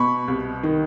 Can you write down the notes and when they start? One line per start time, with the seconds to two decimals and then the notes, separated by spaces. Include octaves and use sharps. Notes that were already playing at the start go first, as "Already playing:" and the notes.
Already playing: B2 B5 C#6
0.28 C2
0.63 D#3